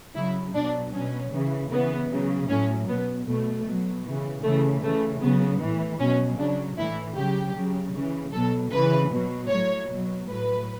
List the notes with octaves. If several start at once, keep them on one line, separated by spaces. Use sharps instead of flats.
C#3 F#3 E4
B2 F#3 D4
B2 F#3 C#4
C#3 E3
C#3 E3 B3
C#3 F#3
A2 F#3 C#4
B2 F#3 B3
B2 F#3 A3
B2 F#3
C#3 E3
C#3 E3 A3
C#3 E3 A3
C#3 F#3 B3
A2 E3
B2 F#3 C#4
C#3 F#3 D4
A2 E3 E4
C#3 F#3 G4
C#3 F#3
C#3 E3
B2 F#3 A4
C#3 E3 B4
B2 F#3
A2 F#3 C#5
B2 F#3
A2 F#3 B4